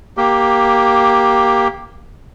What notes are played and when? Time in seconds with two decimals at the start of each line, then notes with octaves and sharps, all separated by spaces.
0.17 A#3 G4